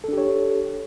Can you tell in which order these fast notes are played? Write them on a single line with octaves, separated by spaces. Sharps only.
A4 D4 G4 C#5